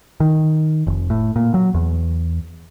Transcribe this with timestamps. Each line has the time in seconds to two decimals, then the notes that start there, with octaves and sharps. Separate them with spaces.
0.20 D#3
0.87 F1
1.10 A2
1.36 A#2
1.54 F#3
1.74 E2